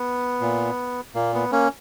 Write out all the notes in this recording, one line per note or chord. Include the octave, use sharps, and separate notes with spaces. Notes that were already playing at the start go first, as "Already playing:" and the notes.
Already playing: B3
A#2
A#2 A#3
B3
A#3 C#4